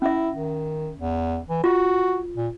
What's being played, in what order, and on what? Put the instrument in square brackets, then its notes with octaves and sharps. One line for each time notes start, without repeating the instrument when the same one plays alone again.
[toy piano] C#4 E5 [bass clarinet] E4
[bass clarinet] D#3
E2
E3
[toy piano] F4 [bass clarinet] F#4
[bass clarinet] A#2